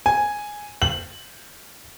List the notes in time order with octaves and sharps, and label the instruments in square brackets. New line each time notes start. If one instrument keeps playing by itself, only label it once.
[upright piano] G#5
F#7